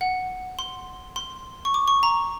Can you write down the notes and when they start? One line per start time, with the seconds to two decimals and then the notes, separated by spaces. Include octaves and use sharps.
0.01 F#5
0.59 C6
1.16 C6
1.65 C#6
1.74 D6
1.88 C#6
2.03 A#5